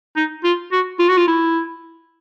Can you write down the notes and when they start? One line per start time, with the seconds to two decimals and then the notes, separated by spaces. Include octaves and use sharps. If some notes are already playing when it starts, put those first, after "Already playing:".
0.16 D#4
0.44 F4
0.72 F#4
0.99 F4
1.09 F#4
1.18 F4
1.27 E4